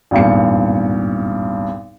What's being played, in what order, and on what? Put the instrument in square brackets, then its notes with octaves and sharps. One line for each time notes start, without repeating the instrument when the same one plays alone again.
[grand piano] G#1 E2 G2 A#2 C#7